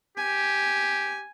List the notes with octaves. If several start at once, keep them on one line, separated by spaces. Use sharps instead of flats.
G4 G#5